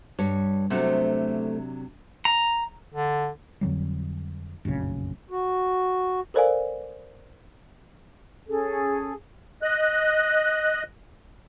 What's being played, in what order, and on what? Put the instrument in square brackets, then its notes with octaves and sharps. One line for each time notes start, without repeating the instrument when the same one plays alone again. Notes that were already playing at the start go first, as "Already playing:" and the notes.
[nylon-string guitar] G2 G3 C#5
[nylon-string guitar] C3 F#3 D4 [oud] A3 B3 C4
[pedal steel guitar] A#5
[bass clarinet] D3
[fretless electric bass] F2 D3 F#3 G3
F1 A#1 F#2 C#3
[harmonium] F#4
[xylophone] A4 A#4 C5 D5 F5 G#5
[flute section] C#4 G#4 A4
[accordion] D#5 F#6